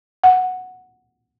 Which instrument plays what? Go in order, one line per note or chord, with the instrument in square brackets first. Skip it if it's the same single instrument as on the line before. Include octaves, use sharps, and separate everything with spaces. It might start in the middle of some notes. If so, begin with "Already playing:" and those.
[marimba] F#5